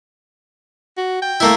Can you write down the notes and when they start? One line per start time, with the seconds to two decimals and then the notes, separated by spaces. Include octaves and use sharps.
0.97 F#4
1.22 G5
1.40 A3 A#3 E4